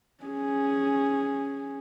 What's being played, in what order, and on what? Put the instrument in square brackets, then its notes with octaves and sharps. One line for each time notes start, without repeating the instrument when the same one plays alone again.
[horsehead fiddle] C#4 G#4